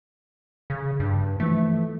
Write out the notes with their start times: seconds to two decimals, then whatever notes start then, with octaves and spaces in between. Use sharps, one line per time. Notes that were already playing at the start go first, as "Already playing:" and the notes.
0.70 C#3
1.00 G2
1.40 E3 F3 A3